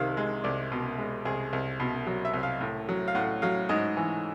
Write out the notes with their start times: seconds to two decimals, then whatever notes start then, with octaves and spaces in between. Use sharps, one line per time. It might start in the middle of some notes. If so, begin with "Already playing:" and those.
Already playing: C2 C3 D#3 F5
0.17 G#3
0.44 C2 D5
0.72 B2
0.98 G#3
1.25 C2 G#4
1.53 C2
1.80 B2
2.07 F#3
2.25 E5
2.33 C2
2.43 F5
2.61 A2
2.89 F#3
3.08 F5
3.15 A2 F#5
3.42 F#3 F5
3.69 G#2 D#5
3.97 E3